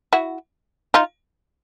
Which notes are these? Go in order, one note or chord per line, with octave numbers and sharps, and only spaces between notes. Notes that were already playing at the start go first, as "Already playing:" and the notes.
E4 F#4
D#4 F4